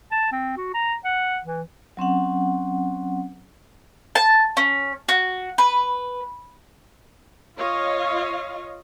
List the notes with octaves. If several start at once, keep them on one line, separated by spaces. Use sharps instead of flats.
A5
C4
F#4
A#5
F#5
E3
F#3 C4 C#4 F#5
A5
C#4
F#4
B4
F4 C#5 D#5 F5